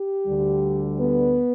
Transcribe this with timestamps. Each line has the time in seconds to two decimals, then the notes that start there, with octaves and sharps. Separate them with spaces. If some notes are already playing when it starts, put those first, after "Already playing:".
Already playing: G4
0.27 D2 D3 G3
0.99 B3 B4